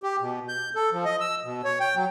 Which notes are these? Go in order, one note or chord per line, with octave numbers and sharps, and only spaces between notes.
G4
B2
G6
A4
F3
D#5
E6
B2
C#5
G5
F#3